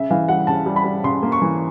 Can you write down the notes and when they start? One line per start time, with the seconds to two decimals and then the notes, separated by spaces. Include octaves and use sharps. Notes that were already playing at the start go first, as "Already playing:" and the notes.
Already playing: C#3 E5
0.10 E3 F5
0.28 G3 F#5
0.47 C#3 A5
0.66 G3
0.76 B5
0.84 G3
1.04 C#3 C6
1.23 A#3
1.32 C#6
1.42 E3